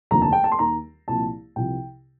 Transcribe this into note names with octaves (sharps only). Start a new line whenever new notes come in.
F1 D#2 D3 F3 A#5
A5
G5
A5
C6
D#2 D#3 A#5
C2 A#2 F3 A5
C2 C3 F3 G5